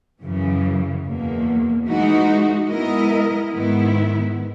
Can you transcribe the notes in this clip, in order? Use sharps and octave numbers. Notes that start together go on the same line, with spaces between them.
F#2 C#3 E3
E2 B2 A#3
E3 G#3 D#4 F#4
G#3 B3 E4 A#4 D#5
G#2 D#3 G#3 B3 E4